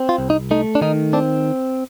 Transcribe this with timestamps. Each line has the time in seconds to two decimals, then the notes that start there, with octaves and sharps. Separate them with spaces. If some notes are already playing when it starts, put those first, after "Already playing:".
Already playing: C4
0.09 F4
0.18 C2
0.30 D#4
0.51 A3 D#4
0.75 D4
0.81 D#3 D#4
1.13 C4 D4